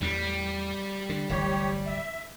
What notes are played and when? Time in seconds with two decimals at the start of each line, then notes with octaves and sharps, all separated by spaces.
0.02 E2 A2 G3
1.09 D3
1.30 D1 G1 E3 G4 C#5
1.86 E5